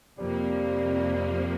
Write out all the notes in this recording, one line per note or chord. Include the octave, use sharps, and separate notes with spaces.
F2 C3 F3 G3 A#3